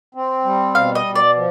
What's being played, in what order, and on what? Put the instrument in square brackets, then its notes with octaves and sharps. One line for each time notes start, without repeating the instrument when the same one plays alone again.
[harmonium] C4
G3
[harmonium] B2 [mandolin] F5
[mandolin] D#5
[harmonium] B2
[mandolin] D5
[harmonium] F3